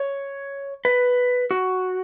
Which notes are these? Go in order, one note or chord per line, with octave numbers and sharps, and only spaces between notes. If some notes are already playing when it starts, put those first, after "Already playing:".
Already playing: C#5
B4
F#4